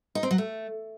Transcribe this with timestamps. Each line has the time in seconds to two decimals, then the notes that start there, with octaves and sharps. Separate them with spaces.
0.15 D#4
0.23 C4
0.31 F#3
0.38 A3